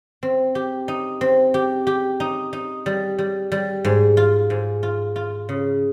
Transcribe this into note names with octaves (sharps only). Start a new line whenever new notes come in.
C4
G4
D#4
C4
G4
G4
D#4
D#4
G3
G3
G3
G#2
F4
G#2
F4
F4
C#3